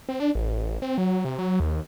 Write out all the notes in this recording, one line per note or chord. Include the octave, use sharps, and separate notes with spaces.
C4
D4
A1
C4
F#3
C3
F#3
D#2